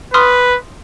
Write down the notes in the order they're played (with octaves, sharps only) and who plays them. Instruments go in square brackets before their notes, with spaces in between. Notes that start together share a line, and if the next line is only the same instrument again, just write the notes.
[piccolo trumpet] B4 [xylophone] C6 D#6 F6